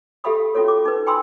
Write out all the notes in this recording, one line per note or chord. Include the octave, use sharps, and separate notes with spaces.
G4 A4 E5 F5 B5 D#6
C#4 F4 F#4 A4 C#5
D6
D#4 B4
G5 G#5 B5 C6 D#6 E6